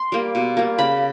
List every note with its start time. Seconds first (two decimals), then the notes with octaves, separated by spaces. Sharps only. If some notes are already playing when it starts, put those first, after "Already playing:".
Already playing: C6
0.12 G3 A#3
0.35 B2
0.57 G3 A#3
0.78 C#3 B5